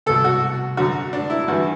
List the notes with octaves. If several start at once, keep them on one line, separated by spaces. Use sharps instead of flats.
C2 B2 A4
F#4
F#2 D3 F#4
D4
E4
G2 E3 F#4